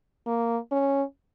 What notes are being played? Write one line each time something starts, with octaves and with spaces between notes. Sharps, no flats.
A#3
C#4